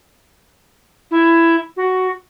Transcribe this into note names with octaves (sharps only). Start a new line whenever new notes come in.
E4
F#4